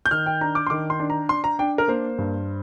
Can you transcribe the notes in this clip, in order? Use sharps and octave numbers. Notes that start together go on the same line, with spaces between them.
G6
D#3 F6
G5
D4 A#5
D6
C6
D#3 D6
C6
D4
A#5
D4 C6
A#5
D4 G5
A#4
A#3 C5
G2